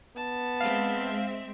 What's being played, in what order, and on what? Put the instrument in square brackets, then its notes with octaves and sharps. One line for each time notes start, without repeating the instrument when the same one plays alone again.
[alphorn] B3 [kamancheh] A5
[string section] G#3 C4 E5 [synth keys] F5